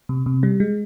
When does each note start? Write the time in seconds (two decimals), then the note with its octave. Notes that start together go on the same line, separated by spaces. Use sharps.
0.09 C3
0.26 C3
0.43 G3
0.60 G#3